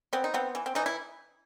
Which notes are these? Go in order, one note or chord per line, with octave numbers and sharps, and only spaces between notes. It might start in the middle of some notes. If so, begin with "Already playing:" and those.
B3 C4
D#4
B3 C4
E3
C4
E3 D#4
E4